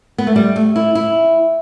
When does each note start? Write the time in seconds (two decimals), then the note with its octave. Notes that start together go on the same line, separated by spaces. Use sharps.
0.18 B3
0.27 A3
0.36 G3
0.56 A3
0.76 E4
0.95 E4